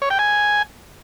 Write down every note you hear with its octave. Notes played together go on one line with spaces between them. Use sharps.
C#5
G5
G#5